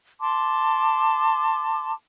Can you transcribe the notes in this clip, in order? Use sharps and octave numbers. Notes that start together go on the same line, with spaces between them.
A5 C6 D6